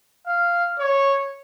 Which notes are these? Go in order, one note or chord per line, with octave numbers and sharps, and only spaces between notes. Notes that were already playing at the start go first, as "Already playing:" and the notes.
F5
C#5